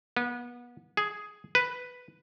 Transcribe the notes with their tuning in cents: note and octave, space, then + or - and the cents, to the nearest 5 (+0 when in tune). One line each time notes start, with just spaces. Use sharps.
B3 -30
G#4 +5
B4 +0